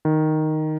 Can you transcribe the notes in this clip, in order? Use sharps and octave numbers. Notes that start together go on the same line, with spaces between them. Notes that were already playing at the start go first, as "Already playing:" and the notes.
D#3